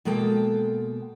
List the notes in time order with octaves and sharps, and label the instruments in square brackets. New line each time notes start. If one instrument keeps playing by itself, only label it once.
[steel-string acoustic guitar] B2 G#3 A#3 A4 G5